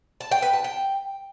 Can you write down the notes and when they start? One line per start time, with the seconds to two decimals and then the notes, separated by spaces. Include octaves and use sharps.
0.21 A5
0.31 G5
0.42 B4
0.53 A5
0.64 G5